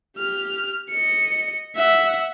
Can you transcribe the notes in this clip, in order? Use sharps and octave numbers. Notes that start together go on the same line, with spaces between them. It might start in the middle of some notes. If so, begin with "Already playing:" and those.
G4 F6
D#5 C#7
E5 F#5